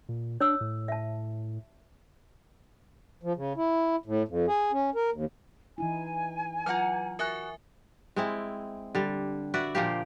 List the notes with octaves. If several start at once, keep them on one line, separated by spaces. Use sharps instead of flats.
A#2
D4 C#5 D#6 E6
A2
E5 A5
F3
C#3
E4
A2
F2
G#4
C#4
A#4
D#2
E3 D#4 E4 G#5
F#3 F4 F#5 A#5 F6
F#4 A#4 E5 G#5 F#6
G#3 C4 E4
D3 G3
F#4 B4 D5 E5
A#2 F3 A#3 G4